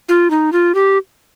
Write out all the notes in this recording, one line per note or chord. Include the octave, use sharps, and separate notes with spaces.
F4
D#4
F4
G4